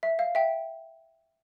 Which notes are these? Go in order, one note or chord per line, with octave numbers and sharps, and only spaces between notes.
E5
F5
E5 G5